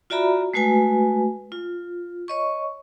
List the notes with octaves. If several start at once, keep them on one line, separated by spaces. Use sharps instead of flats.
F4 F#4 D5 E5 A#5 B5
G#3 A3 F#4 B4 G#5
F4
C#5 D#5 C#6